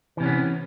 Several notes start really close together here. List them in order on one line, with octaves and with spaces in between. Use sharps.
E3 C3 C#4 B3